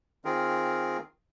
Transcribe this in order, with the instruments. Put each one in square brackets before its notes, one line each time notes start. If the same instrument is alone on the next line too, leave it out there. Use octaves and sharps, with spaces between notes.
[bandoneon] D#3 C4 F4 G#4 A#4